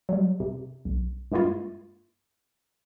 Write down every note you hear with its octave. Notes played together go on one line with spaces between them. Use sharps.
F#3 G3
C3
B1
G2 G#3 A#3 E4 F4